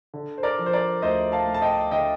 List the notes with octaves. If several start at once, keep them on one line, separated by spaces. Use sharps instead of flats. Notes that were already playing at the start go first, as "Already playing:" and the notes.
D3
C5
A#4 D5
F3
C5
A#4 D5
D2 C5 D#5
F5 A5
A3
A5
D#5 G5
D3 D#5 G5